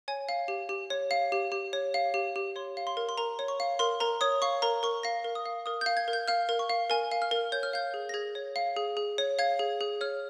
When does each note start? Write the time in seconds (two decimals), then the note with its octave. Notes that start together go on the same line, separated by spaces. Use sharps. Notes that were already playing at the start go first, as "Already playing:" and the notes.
0.08 C#5 G#5
0.29 F5
0.48 G4
0.69 G4
0.90 C#5
1.11 F5
1.32 G4
1.52 G4
1.73 C#5
1.94 F5
2.14 G4
2.36 G4
2.56 C#5 C6
2.77 F5
2.87 C6
2.97 A#4
3.09 C6
3.18 A#4 A#5
3.39 C#5
3.48 C#6
3.60 F5
3.79 A#4 C6
4.00 A#4 A#5
4.21 C#5 D#6
4.42 F5 C#6
4.62 A#4 A#5
4.83 A#4 C#6
5.03 F5 A#6
5.24 A#4
5.35 D#6
5.46 F5
5.66 A#4 D#6
5.81 F5 G6
5.97 G#6
6.08 A#4
6.13 G6
6.28 F5 F6
6.49 A#4
6.59 C#6
6.70 F5
6.90 A#4 G#5
7.11 F5
7.22 F6
7.31 A#4
7.52 C#5 G6
7.63 F6
7.73 F5 G6
7.94 G#4
8.09 A#6
8.14 G#4 G#6
8.35 C#5
8.56 F5
8.76 G#4
8.97 G#4
9.18 C#5
9.39 F5 G#6
9.59 G#4
9.81 G#4
10.01 C#5 F6